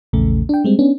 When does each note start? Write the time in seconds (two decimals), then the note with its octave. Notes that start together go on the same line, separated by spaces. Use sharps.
0.13 A#1 E2 C#3 A3
0.49 D4 G5
0.64 G3 G#3 C4
0.79 B3 C#4 D4